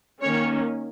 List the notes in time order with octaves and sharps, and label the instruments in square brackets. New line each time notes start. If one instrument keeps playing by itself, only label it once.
[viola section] D#3 A#3 C#4 C#5